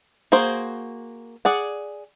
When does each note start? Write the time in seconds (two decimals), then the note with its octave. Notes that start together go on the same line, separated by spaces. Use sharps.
0.32 A#3 F#4 G#4 C5
1.45 G#4 D5 F#5